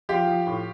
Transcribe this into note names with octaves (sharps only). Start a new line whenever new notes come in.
F3 F4 G4
F3
A2